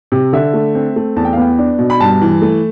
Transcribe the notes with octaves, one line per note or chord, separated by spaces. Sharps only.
C3
D3 E5
A3
C4
A3
E2 A5
G5
F5
B3 G5
D4
B2
B5
G2 A5
E3
A3